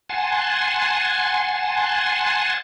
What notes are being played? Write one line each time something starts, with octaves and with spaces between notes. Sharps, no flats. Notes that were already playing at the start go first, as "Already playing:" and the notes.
F#5 G#5 A5 C6